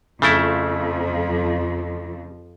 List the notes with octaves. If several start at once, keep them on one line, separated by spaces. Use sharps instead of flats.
F2 C#3 F3 A3 E4